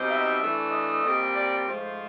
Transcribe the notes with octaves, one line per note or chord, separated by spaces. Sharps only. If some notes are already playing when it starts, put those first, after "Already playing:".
Already playing: B2 G3 C4 D#4
E5
E3 A3 D4
D#5
A#2 G3 C4
D5
G#2 F3 A3 C5